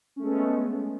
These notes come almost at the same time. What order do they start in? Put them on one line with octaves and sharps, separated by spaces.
C#4 A3 G#3 B3